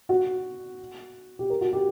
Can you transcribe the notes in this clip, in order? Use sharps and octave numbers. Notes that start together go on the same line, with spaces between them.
F#4
G4
A#4
F#4
G4